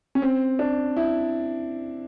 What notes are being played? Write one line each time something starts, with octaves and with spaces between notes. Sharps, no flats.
C#4
C4
D4
E4